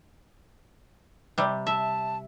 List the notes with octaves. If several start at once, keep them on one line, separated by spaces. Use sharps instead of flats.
C3 G3
E5 A5